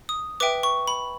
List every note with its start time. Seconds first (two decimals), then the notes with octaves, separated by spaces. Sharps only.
0.09 D#6
0.40 B4 E5 G5 D6
0.63 C#6
0.88 B5